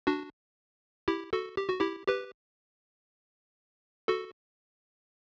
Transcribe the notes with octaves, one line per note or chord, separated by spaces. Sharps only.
D4 F#4
E4 G4
F#4 A4
G4
F#4
E4 G4
G4 B4
F#4 A4